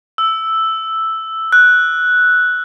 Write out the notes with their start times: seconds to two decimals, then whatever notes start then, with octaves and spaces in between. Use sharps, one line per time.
0.18 E6
1.52 F#6